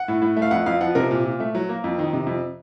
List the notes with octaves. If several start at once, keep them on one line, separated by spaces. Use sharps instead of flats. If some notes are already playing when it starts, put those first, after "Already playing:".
Already playing: F#5
A2
A2
A3
F5
F2 F#5
F2 F5
F3 F#5
C3 A#4
A#2
A#2
A3
F#3
A#3
F2
D#3
C3
F2